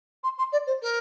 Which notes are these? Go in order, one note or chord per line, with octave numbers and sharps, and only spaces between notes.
C6
C6
D5
C5
A#4